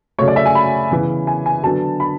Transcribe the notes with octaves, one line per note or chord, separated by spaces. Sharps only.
C#3 F#3 A3 C#5
D5
E5
G#5
B5
C#3 E3 B3
G#5
G#5
D3 F#3 B3 A5
B5